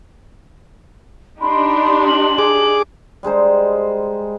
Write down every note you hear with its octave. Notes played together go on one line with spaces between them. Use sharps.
D4 D#4 G4 B5 C6
F#7
G#4 D6
G3 G#3 D#4 C5